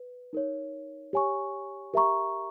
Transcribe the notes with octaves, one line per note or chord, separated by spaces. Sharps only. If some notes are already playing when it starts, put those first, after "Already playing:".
Already playing: B4
D#4 A#4 C#5
G4 C#5 G#5 C#6
G4 A#4 E5 A#5 C#6